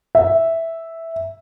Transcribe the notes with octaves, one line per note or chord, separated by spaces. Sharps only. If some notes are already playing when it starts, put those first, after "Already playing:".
E5